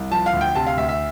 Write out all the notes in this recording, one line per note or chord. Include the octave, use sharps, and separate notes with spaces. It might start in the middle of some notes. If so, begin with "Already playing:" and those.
Already playing: C2
F3 A5
F5
D2
G5
C3 A5
F5
D2 E5
E5